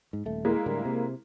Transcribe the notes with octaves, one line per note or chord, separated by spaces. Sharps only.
G#2
D#1 A3
G#3 A#3 E4
A2 D3 G3
C3